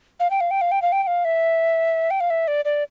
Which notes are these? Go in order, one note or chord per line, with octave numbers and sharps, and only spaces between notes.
F5
G5
F5
G5
F5
G5
F5
G5
G5
F5
E5
G5
F5
E5
D5
D5